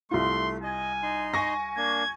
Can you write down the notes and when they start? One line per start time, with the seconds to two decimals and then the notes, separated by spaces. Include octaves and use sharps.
0.11 C2 A3 F4 C6
0.63 D#5 G#5
1.02 D#4 C6
1.34 G#5 C#6 A#6
1.77 A#3 D4 G#6